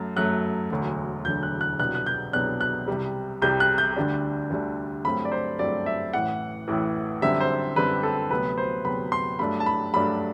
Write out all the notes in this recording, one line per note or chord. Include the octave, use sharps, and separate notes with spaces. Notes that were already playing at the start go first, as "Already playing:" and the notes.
Already playing: F#2 F#3 A3
F#2 F#3 A3 F#6
E1 D2 D3 F#3
E1 D2 D3 F#3 G6
F#6
F#6
C2 B2 F#3 B3 D4 F#6
F#6
G6
C2 B2 F#3 B3 D4 F#6
F#6
C2 C3 G3
C2 C3 G3 G6
F#6
G6
D2 D3 G3 D4
D2 D3 G3 D4
G2 F#3 A3 C4 B5
D5
C5
G2 F#3 A3 C4 D5
E5
A1 A2 E3 F#5
A1 A2 E3
F#2 D3 G3 C4 E5
C5
F#2 D3 G3 C4 B4
A4
D2 C3 F#3 B3 B4
C5
D2 C3 F#3 B3 B5
C6
G2 F#3 A3 D4 B5
A5
B5
G2 F#3 A3 D4 B5